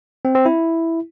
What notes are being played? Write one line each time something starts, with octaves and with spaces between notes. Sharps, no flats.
C4
C4
E4